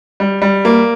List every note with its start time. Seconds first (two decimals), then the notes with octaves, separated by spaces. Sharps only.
0.20 G3
0.42 G3
0.65 A#3